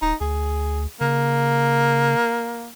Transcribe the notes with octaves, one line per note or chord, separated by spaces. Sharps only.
D1 D#4
D2 G#4
C#3 A#3